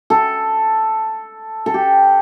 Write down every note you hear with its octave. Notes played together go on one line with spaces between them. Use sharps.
A4
A4
G4